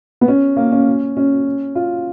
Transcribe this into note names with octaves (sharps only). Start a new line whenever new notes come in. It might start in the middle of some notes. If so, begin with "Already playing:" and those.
B3
C#4
A#3
C#4
C#4
F4